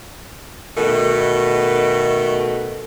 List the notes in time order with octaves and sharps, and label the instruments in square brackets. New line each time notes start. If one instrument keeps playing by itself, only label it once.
[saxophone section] B2 D#3 A3